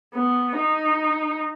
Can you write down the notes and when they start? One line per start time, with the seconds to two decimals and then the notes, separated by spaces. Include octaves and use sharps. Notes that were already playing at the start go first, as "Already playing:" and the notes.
0.14 B3
0.58 D#4